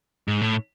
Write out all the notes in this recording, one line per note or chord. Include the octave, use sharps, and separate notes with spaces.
G#2
A2